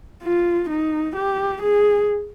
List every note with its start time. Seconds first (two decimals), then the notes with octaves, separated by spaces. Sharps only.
0.23 F4
0.70 D#4
1.16 G4
1.62 G#4